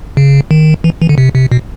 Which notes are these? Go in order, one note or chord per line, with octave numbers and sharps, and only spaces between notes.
C#3
D#3
E3
E3
D3
C3
C3
B2